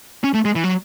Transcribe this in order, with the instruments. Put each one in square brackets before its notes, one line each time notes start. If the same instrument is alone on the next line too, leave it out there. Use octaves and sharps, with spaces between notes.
[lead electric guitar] C#4
A3
G#3
E3
F#3